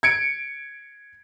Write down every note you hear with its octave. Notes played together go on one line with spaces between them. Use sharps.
G#6 C#7 D7